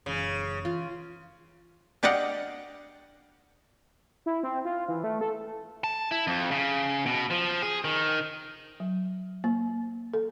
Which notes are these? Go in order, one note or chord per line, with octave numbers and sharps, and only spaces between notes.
F#1 C#3 E3
E3 F4
D4 G4 D5 D#5 F5 F#5
E4
C4
F4
E3
A3
A4
A5
E4
F2
C#3
B2
F3
G#4
D#3
F#3
A#3
A4